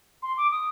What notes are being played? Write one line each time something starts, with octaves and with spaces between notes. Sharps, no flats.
C6
D6
D#6